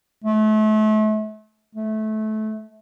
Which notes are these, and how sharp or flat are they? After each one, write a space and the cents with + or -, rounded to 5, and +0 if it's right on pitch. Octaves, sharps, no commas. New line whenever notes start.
A3 -35
A3 -20